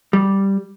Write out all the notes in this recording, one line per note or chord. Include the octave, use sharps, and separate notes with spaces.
G3